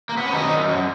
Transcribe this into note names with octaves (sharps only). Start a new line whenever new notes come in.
A#3
B3
C#4
F#2 D#3 D#4
F#2
F#2